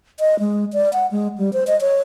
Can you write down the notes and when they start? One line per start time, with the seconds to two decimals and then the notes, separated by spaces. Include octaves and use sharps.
0.20 D#5
0.39 G#3
0.73 D5
0.93 F#5
1.11 G#3
1.38 G3
1.53 C5
1.67 D#5
1.81 C#5